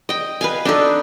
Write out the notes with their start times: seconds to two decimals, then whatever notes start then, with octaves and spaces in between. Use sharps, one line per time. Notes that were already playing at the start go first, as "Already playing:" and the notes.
0.09 D#5 G5
0.41 B4 F5 G#5
0.65 D4 D#4 A4